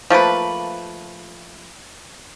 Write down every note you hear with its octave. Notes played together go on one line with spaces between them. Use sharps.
F3 A3 A#3 B4